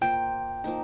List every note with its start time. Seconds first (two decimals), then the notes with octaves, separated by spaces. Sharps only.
0.02 A#3 F4 C5 G5
0.64 F3 A#3 D#4